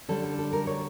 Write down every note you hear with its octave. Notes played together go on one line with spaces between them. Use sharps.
D3 G3 C#4 A4
A4
A4
A#4
C#5